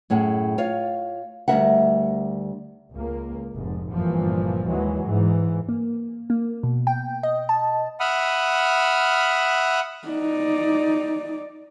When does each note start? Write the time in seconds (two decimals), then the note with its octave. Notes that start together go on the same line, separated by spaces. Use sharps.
0.10 F#2 A2 G#4 F#5
0.58 F4 C#5 F5
1.48 D2 E3 G3 A#4 E5 F#5
2.94 C#2 A#3
3.55 F1 G#2
3.92 G1 A#2 E3 F3
4.67 D#2 E3 F#3 G#3
5.03 G#2 E3
5.69 A#3
6.30 A#3
6.63 B2
6.87 G5
7.23 D#5
7.49 A5
8.00 E5 F#5 B5 D#6 F6
10.08 D#4 D5